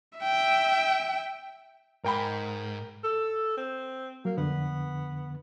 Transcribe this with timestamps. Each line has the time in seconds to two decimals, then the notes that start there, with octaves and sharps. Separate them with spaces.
0.19 E5 G5
2.04 G#2 A#4 G5 B5
3.04 A4
3.57 C4
4.25 F#3 A#3
4.37 F2 D3 B3